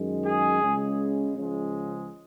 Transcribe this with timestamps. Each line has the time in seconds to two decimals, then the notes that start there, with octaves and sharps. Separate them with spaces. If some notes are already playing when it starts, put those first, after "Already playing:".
Already playing: F#2 D#3 G#3
0.24 G#4
0.62 C#2 C#3 G#3
1.36 C#2 C#3 F3 G#3